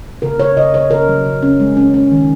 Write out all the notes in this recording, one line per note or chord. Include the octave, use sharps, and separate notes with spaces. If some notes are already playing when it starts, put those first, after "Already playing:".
C#3 A#4
C#3 C#5
C#3 D#5
C#3 C#5
C#3 A#4
F#3
C#3
C#4
G#3
C#4
C#4
D#3